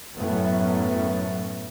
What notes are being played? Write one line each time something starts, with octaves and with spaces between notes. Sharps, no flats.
F#2 A2 F#3 A3 B3 C#4